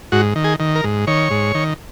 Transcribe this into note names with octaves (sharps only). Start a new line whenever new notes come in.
G#2 F#4
D#3
G#4
D#3
A#4
G#2
D#3 C#5
G#2
D#3